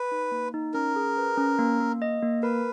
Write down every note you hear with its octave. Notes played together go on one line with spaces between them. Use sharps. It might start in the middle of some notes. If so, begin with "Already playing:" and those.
Already playing: B4
D#4
A#3
D#4
C#4 A#4
G#4
B4
C#4
A#3
A#3
D#5
A#3
A#4 B4